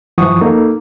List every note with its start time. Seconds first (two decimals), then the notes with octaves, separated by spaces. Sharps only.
0.18 G2 E3 F3 F#5 C#6 D#6
0.41 A#3 D#4 A4